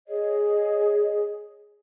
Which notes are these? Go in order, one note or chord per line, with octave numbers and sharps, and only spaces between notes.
G#4 C#5 D#5